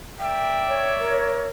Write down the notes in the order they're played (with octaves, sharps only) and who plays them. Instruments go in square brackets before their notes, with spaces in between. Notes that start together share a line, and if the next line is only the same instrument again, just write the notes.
[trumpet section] A#3 D5 E5 [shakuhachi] G5
[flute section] C#5
[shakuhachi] A#4